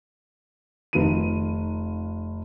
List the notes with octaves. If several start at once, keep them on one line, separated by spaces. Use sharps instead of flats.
F1 D#3 F4 B4 D#7